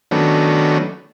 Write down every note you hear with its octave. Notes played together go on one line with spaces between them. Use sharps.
D#3 F#3 A3 B3 C#4 D4